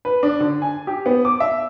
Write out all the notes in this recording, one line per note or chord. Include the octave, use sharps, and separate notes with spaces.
B4
D4
D3
G#5
G4
B3
D6
E5